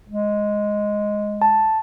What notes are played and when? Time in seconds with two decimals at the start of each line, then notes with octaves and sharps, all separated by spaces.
0.09 G#3
1.42 A5